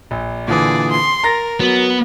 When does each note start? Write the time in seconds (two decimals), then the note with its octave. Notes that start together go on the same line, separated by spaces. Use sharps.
0.11 A#1
0.48 A#2 D3 E3 G#4 D5
0.91 C6
1.24 A#4 A#5 A6 A#6
1.60 F#3 B3